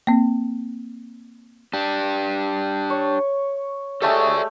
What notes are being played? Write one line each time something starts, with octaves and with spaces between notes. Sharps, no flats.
A#3 C4
D4 G4
C#5
G#3 A3 G4 A4 D5 E5